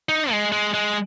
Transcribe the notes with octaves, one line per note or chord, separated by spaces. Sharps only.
D#4
G#3
G#3
G#3